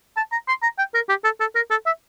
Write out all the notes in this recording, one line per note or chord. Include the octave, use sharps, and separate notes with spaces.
A5
A#5
C6
A#5
G5
A#4
G4
A4
A4
A#4
A4
E5